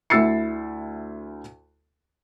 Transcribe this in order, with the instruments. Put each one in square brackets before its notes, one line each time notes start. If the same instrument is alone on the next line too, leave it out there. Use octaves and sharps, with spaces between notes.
[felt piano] D2 E4 E6 A6 C7 C#7